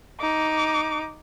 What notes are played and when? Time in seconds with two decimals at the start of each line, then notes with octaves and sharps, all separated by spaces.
0.21 D#4 D6